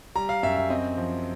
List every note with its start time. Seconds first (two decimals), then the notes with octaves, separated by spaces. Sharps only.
0.15 G3 A#5
0.29 F5
0.43 F#2 E5
0.56 E5
0.70 C4 D#5
0.97 F3